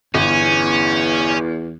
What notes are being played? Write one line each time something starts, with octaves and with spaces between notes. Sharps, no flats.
G1 E2 C#4